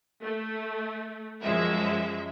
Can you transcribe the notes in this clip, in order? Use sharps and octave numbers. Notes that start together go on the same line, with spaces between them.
A3
F#2 F3 G#3 E5